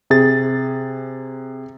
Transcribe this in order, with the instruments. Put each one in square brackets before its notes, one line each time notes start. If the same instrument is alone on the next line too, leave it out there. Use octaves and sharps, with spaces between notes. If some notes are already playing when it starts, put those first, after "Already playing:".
[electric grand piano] C3 G#4 A6